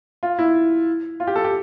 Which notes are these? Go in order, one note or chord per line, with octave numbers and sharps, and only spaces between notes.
F4
E4
F4
G4
A4
G4